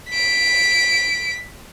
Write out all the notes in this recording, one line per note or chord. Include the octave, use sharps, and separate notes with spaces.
B6 D7